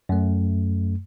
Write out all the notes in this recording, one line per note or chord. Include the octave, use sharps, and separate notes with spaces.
F#2 A3